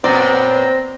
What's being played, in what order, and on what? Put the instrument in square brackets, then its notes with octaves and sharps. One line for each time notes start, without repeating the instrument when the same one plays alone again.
[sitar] F#2 A#2 B3 [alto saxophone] C4 [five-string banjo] D5 [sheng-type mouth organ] A#5